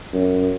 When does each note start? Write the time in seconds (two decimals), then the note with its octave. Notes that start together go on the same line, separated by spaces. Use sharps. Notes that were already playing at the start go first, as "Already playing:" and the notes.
0.13 F#2